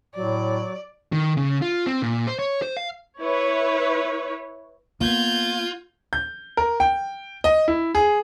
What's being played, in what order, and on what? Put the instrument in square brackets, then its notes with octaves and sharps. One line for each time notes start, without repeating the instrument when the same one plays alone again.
[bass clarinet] A2 [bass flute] F#3 [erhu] D5
[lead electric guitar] D#3
C#3
F4
C4
A#2
C5
C#5
C5
F5
[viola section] E4 B4 C#5
[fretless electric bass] A#3 B3 [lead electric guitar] F4 [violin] G6 G#6
[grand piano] G6
A#4
G5
D#5
E4
G#4